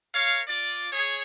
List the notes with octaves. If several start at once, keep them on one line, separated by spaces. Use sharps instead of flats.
A#4 C#5 F5
F4 D5
G#4 C#5